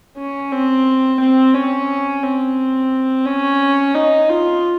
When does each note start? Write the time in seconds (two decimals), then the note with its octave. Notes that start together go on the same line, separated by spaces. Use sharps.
0.17 C#4
0.52 C4
1.20 C4
1.54 C#4
2.23 C4
3.26 C#4
3.95 D#4
4.30 F4